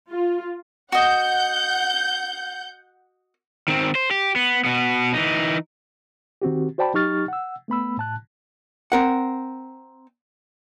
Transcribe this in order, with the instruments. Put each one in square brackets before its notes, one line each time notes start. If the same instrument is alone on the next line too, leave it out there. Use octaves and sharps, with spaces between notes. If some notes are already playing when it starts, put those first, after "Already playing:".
[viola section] F4
[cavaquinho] F#4 D#5 [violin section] F#5 G6
[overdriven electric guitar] D#3 C4
C5
G4
B3
B2 B3
E3 D#4
[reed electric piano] D#3 C4 F#4 G4
F#4 C5 D5 G5 A5 B5
F#3 D#4 G4 C#6 F6 A6
F#5 E6
A3 B3 B5 E6
A2 A5 F#6
[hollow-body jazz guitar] C4 A#4 F#5